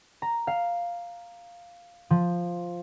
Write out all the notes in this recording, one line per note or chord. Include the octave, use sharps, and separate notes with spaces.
A#5
F5
F3